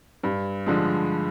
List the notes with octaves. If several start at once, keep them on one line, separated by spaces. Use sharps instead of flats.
G2
D3 F3 G#3